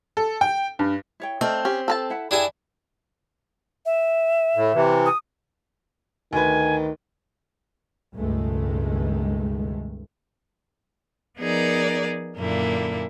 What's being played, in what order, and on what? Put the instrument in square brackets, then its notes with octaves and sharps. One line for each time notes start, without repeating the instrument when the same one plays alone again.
[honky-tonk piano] A4
G5
G2
[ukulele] E4 C#5 G5
[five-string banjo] A3 [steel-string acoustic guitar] C4 [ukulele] A#4 D5 D#5
[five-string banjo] C#4 [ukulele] G4
[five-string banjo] A4 B4 A5
[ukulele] E4 F#5 B5
[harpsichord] D4 E4 G#5 [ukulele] G4 G#4 G5
[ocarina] E5
[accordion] A2
C3 E3
[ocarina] D#6
[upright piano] D2 B4 [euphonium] D#3 [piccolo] G#5
[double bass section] C#2 G2 B2 D#3 G#3 A3
[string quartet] F3 B3 D#4 G#4 A#4 D5
F#2 A#2 D3 A#3 E4